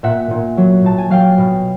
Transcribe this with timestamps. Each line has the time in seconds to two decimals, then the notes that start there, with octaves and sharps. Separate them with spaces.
0.03 A#2 E5 F#5
0.31 A#2
0.57 F#3
0.84 A#2 A5
0.98 G#5
1.10 F#3 F5 G5
1.38 B2